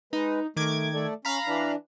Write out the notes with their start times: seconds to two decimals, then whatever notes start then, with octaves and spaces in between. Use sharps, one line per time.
0.13 G#3 D#4 B4
0.56 D#3 A3 D6 G#6
0.94 A3 A4 D5
1.25 C#4 F5 A#5 B5
1.47 E3 D4